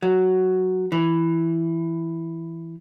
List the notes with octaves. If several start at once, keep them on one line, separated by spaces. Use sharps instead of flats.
F#3
E3